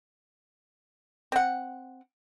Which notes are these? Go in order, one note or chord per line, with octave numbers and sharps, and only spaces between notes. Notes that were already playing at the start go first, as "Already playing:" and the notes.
C4 F#5